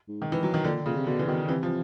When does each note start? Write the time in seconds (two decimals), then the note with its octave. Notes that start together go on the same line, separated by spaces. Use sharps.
0.08 G#2
0.22 D#3
0.32 E3
0.43 F#3
0.54 D#3
0.64 A#2 D3
0.86 A#2 C#3
0.97 C3
1.07 B2 D3
1.19 E3
1.28 B2 D#3
1.49 C3 E3
1.63 F3